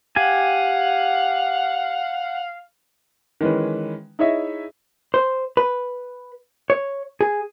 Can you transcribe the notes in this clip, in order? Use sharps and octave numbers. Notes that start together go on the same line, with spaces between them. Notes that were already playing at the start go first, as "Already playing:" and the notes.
G4 F5 F#5 G#5
D#3 E3 G#3 C#4 B4
D#4 E4 G#4 C#5 D#5 E5
C5
B4
C#5
G#4